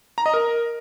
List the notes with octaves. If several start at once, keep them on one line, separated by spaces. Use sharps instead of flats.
A#5
D#5
A#4